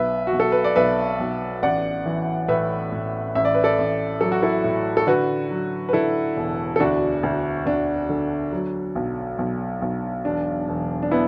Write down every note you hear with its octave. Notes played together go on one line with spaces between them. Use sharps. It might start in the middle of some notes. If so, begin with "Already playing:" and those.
Already playing: B1 B4 E5
F#4
B1
A4
B4
D5
B1 B4 E5
B1
A1 D5 F#5
E3
A2 B4 E5
A2
A1 E5
D5
B4
A4 D5
A1
F#3 A4
F#4
E4 A4
A2
A4
D3 F#4 B4
F#3
B4
D3 E4 A4
E1
A4
D2 D4 F#4
D2
D2 D4
D3
F#3
B1
B1
B1
E1 D4
E1
D4
B3 E4